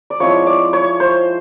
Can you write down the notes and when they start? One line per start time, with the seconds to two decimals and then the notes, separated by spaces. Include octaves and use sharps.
0.10 D5
0.20 F3 G#3 C4 E4 C#5
0.47 D5
0.73 C#5
1.00 C5